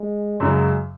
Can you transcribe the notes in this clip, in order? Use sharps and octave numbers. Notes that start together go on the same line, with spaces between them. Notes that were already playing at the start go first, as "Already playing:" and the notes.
Already playing: G#3
F#2 C#3 F#3 G#3